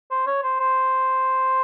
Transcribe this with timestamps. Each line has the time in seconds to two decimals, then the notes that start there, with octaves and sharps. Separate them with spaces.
0.11 C5
0.27 C#5
0.43 C5
0.60 C5